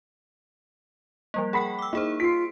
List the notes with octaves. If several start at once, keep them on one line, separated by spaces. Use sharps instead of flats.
F3 G3 A#3
G#4 A#4 F#5 G5 B5 B6
D6 E6
A#3 D#4 E4 G#4 C5
F4 B6 C7 D7